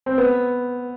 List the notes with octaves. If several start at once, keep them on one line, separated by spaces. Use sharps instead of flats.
C4
B3